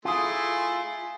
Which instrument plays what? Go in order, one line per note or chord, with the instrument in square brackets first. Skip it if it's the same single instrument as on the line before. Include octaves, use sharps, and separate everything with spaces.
[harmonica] A3 E4 C6 [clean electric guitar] F4 G#4